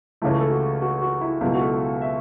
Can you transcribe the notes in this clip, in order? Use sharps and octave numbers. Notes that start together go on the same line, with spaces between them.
C#2 C#3 E3 A3 E4
A4
F#4
F#4
F#4
E4
C#2 B2 F#3 E4
F#4
A4
E5